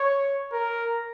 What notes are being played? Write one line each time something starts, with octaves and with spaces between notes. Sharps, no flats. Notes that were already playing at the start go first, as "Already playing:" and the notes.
Already playing: C#5
A#4